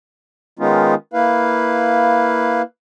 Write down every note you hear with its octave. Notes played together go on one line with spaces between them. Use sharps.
D#3 G#3 B3 C#4 D#4 F4
A#3 E4 B4 F5